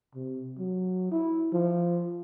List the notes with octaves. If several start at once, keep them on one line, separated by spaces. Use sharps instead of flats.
C3
F#3
E4
F3